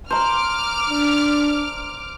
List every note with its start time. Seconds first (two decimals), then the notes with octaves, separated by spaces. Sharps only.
0.10 C5 A#5 D6 F6
0.90 D4